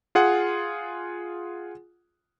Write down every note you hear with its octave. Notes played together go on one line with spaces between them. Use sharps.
F4 G#4 F#5